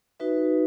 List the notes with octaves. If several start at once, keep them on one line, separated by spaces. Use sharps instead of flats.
D#4 F#4 B4 E5